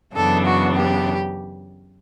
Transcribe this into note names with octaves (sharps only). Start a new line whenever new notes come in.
F#2 C#3 E3 B3 D4 A4
F#4
G4